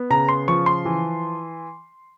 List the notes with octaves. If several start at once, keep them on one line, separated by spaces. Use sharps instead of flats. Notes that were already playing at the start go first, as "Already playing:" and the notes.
Already playing: B3
C#3 A#5
C6
F3 C#6
C6
E3